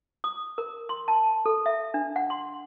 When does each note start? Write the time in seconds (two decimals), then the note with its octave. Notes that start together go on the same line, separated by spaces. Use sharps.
0.24 D#6
0.58 A#4
0.89 C6
1.08 A5
1.46 A4
1.66 E5
1.94 D4
2.16 F#5
2.30 C6